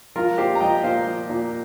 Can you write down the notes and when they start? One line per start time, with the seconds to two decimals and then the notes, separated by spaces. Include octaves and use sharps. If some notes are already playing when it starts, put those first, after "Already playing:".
0.16 F3 F4 A#4
0.38 A#2 G4 C5
0.55 A#5
0.60 F3 D#5 G5
0.83 A#2 C5 F5
1.06 F3
1.29 A#2